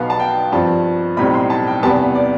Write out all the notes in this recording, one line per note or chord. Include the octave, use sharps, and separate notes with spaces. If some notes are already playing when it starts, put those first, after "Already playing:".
Already playing: B1 B2 B3 F5
A5
G5
G2 F3 C4 A5
B1 A2 G3 C4 B5
C6
A5
G5
E2 C3 G3 B3 A5
D5